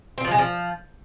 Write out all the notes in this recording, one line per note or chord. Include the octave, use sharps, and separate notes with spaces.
C4
F3
G#3
F3